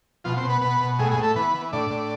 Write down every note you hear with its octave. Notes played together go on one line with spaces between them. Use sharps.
B2 F3 F4
C4 C5
B2
B3 B4
B2 B3 B4
B2
A2 G#3 G#4
G#3 G#4
A2
A3 A4
E3 B3 B4
E3
A2 D4 D5
A2